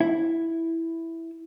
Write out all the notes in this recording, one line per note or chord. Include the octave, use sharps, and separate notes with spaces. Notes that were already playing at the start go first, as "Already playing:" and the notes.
E4